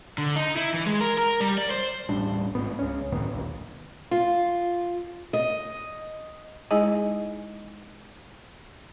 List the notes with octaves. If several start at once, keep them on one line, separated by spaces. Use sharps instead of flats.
D3
D#4
E4
E3
G#3
A#4
A#4
G3
D5
C5
D#1 A1 G3 D4
A1 G#2 B3
C#2 C#4
F#2 A2 D#3 B3
E1 A#1 D#2
F4
D#5
G#3 D#4 E4 G#4 D#5